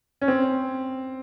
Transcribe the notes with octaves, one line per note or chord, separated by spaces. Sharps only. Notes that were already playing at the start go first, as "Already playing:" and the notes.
C#4
C4